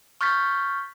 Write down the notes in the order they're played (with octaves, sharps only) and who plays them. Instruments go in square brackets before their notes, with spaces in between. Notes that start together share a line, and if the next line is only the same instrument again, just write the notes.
[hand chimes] C#6 F6 G6 A6 B6